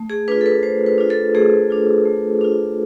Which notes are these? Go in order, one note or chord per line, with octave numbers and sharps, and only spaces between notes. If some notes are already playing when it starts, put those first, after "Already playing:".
Already playing: A3
G#4
D4 F4 B4
A4
B4
A3 C5
B4
D4 F4
A4
A3 G#4
D4 F4
A3
D4 F4